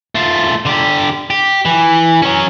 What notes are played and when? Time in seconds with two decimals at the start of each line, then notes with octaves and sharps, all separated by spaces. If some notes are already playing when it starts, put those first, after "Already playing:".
0.15 A3 F4
0.66 D3 G4
1.30 G4
1.65 E3
2.22 F#3 C#4